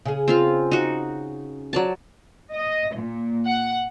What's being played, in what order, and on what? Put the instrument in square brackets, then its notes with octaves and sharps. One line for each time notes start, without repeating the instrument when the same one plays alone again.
[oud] C#3 G#4
[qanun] C4 F4 F5
D#4 F#4
F#3 D5 A5
[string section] D#5
A#2
F#5